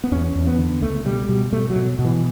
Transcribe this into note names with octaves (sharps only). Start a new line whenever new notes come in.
B3
E2 C#4
E2
B3
D3
C#2 A3
B2 G3
B2 G3
B2 A3
F#3
B2
B2
E3